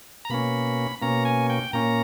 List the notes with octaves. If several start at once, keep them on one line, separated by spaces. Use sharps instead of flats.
A#5
B2 A#3 C#4 B5
B2 A#3 C#4 A#5
G#5
G5
A#2 A#3 C#4 A#5